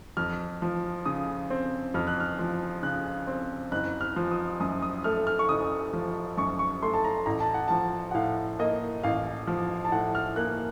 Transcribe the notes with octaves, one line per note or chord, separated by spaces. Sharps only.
F2 F6
F3
C#3 D#6
C4
F2 F6
F#6
F6
F3
C#3 F#6
C4
F#1 F#6
F6
F3
D#6
F#2 D#6
D#6
A3 F6
F6
C#6
F#1 D#6
F3
F#2 C#6
C#6
A3 C6
A5
A#5
A1 A#5
A5
F#5
F3 A5
F#5
A2 F5
A#3 D#5
A1 F5
F3
A5
A2 F#5
F6
A#3 F#6